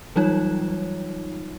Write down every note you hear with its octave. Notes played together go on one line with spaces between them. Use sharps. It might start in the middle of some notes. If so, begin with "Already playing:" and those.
E3 F#3 G3 D#4 F4 C#5